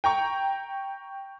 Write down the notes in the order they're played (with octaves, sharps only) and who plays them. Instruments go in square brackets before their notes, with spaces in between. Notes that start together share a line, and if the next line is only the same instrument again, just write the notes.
[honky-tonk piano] G5 A#5 C#6